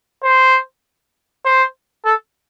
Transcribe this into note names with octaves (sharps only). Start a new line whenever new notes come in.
C5
C5
A4